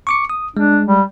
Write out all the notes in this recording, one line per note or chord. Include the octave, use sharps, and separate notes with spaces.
C#6 D6 C#7
D#6
G#3 D4
G3